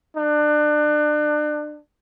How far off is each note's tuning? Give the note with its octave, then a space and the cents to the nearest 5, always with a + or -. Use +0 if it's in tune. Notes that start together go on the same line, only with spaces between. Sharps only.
D4 +30